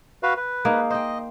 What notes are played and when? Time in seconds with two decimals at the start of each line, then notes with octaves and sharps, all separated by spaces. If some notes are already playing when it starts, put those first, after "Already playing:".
0.23 F#4 B4 F5
0.37 B4
0.65 A#3 D#4 G#4
0.90 C5 D#5 G5